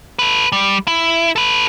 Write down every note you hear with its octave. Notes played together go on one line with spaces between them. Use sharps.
A4 B4
G3
E4
A4 B4